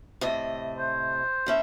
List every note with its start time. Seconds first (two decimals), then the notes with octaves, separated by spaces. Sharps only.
0.21 A2 C3 D#5
0.77 C5
1.46 A2 C#4 E5